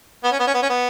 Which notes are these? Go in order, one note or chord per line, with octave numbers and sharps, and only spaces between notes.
B3
C#4
B3
C#4
B3
C#4
B3